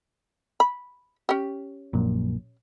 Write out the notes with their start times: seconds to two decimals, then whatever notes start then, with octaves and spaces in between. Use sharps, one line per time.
0.60 B5
1.29 C#4 G4
1.93 A#1 F#2 A#2